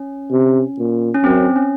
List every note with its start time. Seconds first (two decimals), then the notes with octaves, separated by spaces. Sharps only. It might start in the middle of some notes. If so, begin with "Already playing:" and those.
Already playing: C#4
0.31 C3
0.78 A#2
1.15 C#4
1.24 F#2 C4
1.56 C#4